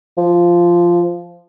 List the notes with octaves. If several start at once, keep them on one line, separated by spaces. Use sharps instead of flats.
F3